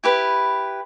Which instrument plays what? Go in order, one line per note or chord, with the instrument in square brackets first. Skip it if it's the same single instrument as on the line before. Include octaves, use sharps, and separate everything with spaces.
[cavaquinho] E4 G4 B4